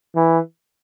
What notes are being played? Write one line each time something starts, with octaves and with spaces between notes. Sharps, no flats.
E3